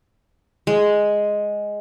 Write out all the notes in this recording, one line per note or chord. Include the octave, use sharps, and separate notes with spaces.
G#3